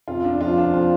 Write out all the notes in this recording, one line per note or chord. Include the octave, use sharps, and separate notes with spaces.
F2 F4
D4
F3 F4
D4
C4 F4